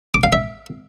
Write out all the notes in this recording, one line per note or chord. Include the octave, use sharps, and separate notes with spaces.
D6
F5
E5